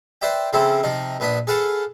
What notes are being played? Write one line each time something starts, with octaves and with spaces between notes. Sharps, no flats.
B4 C5 D5 E5 G5
C#3 F3 C4 E4 A4
C3 F3 D#4
A#1 B3 D4 B5 D#6
G#4 A4 B4 F5 F#5 A5